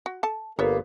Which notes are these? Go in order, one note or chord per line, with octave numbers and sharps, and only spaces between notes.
F#4
A4 A5
G1 A#3 B3 A4 C#5 E5